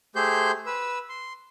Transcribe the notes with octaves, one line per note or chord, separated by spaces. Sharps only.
A3 G4 G#4 C5 C6 G6
B4 E6
C6